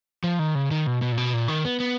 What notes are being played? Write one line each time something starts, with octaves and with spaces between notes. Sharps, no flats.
F3
D#3
C#3
D#3
B2
B2
A#2
B2
A#2
D#3
B3
B3